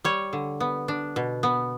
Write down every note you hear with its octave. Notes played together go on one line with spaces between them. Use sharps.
G3 C#5
D3
B3
D4
B2
B3